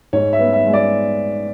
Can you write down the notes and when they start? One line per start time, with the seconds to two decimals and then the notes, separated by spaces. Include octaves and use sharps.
0.13 G#2 C#5
0.33 E5
0.39 B3
0.53 E5
0.67 G#3
0.73 D5